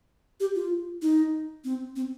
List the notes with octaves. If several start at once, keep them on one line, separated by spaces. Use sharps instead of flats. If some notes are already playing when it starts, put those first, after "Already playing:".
G4
F4
D#4
C4
C4